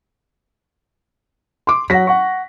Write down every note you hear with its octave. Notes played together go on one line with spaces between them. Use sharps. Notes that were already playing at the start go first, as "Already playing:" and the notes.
C6 D6
F#3 F#5 A#6 B6
F#5 C#6